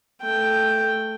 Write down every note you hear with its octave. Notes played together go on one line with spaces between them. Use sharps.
A3 G5